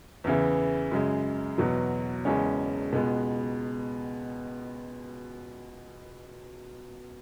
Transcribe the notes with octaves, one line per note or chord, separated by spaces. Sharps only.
E2 C#3 E3
F#2 C#3 G#3
E2 B2 F#3
E1 E2 C#3 G#3 C#4
C#2 B2 G#3 B3